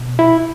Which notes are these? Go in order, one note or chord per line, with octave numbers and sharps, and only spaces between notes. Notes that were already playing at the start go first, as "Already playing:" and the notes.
Already playing: B2
E4